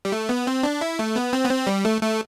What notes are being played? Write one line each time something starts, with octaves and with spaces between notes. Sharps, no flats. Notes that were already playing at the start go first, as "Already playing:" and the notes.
G3
A3
B3
C4
D4
E4
A3
B3
C4
B3
C4
G3
A3
A3